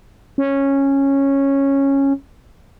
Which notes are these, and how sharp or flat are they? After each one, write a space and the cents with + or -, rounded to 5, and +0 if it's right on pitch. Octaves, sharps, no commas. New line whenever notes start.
C#4 -10